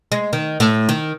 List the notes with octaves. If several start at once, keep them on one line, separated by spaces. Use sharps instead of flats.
G#3
D#3
A2
D#3